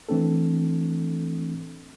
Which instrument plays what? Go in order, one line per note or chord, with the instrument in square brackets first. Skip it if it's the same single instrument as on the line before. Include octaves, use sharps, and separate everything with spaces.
[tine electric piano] E3 A3 C4 D4 A4